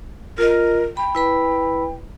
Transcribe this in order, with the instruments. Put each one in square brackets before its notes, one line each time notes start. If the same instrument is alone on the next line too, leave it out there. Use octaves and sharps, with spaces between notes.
[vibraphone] F4 D#5 [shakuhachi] A#4
[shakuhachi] G5 [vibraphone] B5
[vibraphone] E4 B4 B5